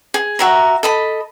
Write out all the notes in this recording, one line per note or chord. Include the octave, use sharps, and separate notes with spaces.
G#4
F#4 E5 A#5
A4 D#5 B5